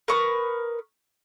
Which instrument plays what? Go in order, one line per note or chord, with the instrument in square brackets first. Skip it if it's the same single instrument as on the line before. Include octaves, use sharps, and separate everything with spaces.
[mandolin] A#4 B4 C#6 D#6